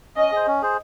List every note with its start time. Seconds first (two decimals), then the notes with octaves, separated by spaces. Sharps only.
0.16 C#4 D#5
0.32 G#4 C5
0.47 C#4
0.62 G#4 C5